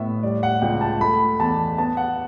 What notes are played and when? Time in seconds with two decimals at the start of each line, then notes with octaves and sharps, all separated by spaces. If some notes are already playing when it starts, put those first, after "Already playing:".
Already playing: A2 B3 E5
0.23 G3 D5
0.43 F#5
0.61 C#2 G5
0.77 G5
0.81 A5
1.00 A3 B5
1.40 E2 A5
1.78 B3 A5
1.97 F#5